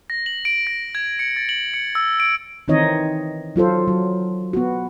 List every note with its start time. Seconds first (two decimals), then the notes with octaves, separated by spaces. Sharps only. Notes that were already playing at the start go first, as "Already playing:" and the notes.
0.10 A#6
0.26 F#7
0.45 D7
0.67 A#6
0.95 G#6
1.19 C#7
1.36 A6
1.49 F#7
1.74 C#7
1.95 E6
2.20 D7
2.68 D#3 E3 C4 D#4 C#5 D#5
3.56 F#3 F4 A4 C5
3.88 F#3
4.53 B3 F#4